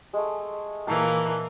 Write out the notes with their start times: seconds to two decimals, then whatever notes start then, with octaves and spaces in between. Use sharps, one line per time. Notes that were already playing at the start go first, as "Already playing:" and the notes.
0.13 G#3 A3
0.87 A#2 E3 A#3 F5 A5 A#5